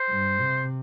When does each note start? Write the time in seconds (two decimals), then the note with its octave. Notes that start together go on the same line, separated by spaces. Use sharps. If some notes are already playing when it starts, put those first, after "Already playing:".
Already playing: C5
0.09 G2
0.41 C3